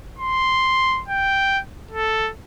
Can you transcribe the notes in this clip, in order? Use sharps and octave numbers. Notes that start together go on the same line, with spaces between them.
C6
G5
A4